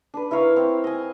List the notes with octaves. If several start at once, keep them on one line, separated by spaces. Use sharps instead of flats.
D4 B4
E4 A#4 C#5 F5
C4
D#5 G#5